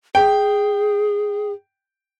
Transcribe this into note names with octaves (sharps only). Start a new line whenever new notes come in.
G#4 G5